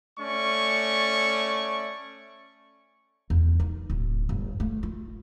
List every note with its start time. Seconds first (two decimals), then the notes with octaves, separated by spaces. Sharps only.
0.19 A3 C#4 D5 C#6
3.30 E2
3.60 D#4
3.90 D1
4.29 G1
4.60 A3
4.83 F4